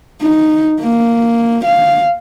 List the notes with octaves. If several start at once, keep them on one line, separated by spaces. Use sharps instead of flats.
D#4
A#3
F5